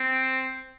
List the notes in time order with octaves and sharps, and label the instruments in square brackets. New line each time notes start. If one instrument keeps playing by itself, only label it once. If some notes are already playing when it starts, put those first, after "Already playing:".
Already playing: [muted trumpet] C4